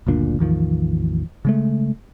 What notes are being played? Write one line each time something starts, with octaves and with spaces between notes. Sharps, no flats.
F#1 D2 A#2 D4
A1 E2 D#3 F3
C#3 G#3 A3